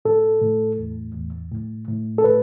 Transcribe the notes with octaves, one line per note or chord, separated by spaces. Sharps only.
A2 A4
A2
E2
E2
A2
A2
A4
A2 B4